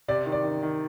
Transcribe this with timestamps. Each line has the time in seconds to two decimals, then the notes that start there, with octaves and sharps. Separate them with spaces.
0.08 C3 D5
0.26 D#3
0.32 D5
0.44 D#3
0.63 D#3